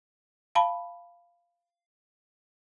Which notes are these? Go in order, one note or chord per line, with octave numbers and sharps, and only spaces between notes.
F5 A5 B5